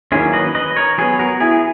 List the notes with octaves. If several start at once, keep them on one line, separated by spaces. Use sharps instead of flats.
D#3 F#3 A#3 C#4 E4 G#4
B4 D#5
B4 D#5
A#4 C#5
F#3 B3 G#4 B4
F#4 A#4
E4 G#4
G#4